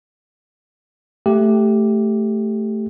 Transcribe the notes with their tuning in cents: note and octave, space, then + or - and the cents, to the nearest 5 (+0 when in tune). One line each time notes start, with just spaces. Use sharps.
A3 +0 G4 +0